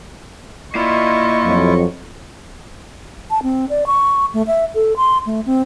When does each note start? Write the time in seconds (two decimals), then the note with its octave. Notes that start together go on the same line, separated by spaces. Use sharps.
0.75 A#3 E4 F4 D5 D#5 C#6
1.45 F2 F#3
3.30 A5
3.43 C4
3.69 D5
3.86 C#6
4.34 A3
4.47 E5
4.75 A4
4.96 C6
5.26 A3
5.46 C4